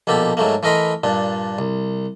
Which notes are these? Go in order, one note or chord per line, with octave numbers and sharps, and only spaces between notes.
A#1 B2 A#3 G4 A4
G#2 F#3 A3 A#3
E3 A3 A#4 D#5 B5 C6
G2 A#2 D4
C2